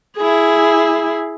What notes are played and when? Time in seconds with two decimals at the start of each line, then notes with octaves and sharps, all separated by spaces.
0.17 E4 G#4